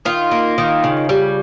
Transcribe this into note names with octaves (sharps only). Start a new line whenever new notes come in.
D#3 F4
A#3
D#3
C#3
G3